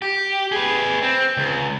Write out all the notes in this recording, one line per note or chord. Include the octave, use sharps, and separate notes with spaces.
G4
G#4 B4
C4
C#2